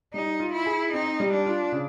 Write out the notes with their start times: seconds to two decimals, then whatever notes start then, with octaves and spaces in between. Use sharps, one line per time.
0.14 G3 D#4
0.40 F4
0.53 E4
0.66 G#4
0.93 C4 D#4
1.20 G3
1.33 D4
1.46 F4
1.72 C#3